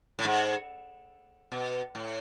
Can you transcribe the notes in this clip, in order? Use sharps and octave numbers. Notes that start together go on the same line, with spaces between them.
A2
G#2
B2
A2